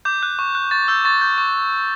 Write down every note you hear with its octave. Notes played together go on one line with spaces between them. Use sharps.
D6 G6
F#6
C#6
F#6
C#6 A6
E6 G6
C#6 A6
G6
C#6